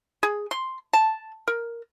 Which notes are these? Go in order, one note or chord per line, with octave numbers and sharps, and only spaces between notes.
G#4
C6
A5
A#4